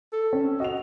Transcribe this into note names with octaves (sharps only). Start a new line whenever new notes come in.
A4
C#4
F#4 D#5 F7